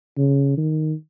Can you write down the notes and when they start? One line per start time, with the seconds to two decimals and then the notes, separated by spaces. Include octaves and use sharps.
0.18 C#3
0.57 D#3